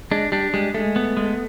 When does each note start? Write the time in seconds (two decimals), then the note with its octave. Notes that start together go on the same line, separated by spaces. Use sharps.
0.11 G#3 D4
0.32 G3 D4
0.54 G3 G#3
0.74 G#3 A3
0.96 B3
1.17 G#3